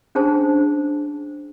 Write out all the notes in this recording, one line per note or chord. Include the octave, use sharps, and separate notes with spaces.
C#4 D4 G#4 C5 A5